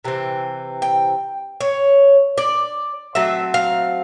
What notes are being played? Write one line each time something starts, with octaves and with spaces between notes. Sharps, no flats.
C3 E3 C4
G5
C#5
D5
F#3 A3 C4 E5
F5